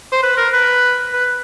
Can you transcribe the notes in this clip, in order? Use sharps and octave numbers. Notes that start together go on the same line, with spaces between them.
C5
B4
A#4
B4
B4